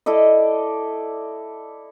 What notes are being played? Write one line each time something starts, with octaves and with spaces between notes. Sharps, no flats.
E4 A4 D5 D#5